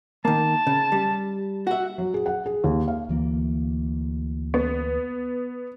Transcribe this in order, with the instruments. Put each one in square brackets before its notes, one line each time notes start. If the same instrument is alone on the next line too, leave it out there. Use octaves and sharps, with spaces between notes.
[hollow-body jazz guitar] D#3 A#3 [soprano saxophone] A5
[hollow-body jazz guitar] C#3
G3
[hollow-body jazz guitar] F#4 E5 [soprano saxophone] F#5
[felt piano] F#3
G#4
F#5
G#4
D#2
F5
[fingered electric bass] D2 E3 A#3
[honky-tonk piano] B3